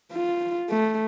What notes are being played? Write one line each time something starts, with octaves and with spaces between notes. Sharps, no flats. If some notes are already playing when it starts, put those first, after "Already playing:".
F4
A3